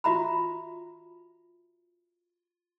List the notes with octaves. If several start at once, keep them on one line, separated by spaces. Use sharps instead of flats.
F4 F#4 E5 A#5 B5